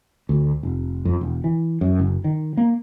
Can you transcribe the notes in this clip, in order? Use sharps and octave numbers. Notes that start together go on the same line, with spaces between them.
D2
F1
F2
E1
E3
F#2
F#1
D#3
A#3